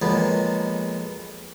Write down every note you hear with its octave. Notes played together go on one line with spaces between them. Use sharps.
F2 A#2 F#3 G#3 B3